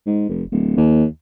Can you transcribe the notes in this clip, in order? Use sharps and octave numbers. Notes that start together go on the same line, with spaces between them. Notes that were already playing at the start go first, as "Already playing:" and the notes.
G#2
F1
D1
D#2